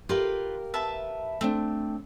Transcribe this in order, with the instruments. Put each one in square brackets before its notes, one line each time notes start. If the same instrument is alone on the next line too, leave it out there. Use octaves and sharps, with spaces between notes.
[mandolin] F4 B4 [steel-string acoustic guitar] G4 A#4 F5
[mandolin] B4 E5 A5
[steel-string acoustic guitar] A3 D4 [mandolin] C4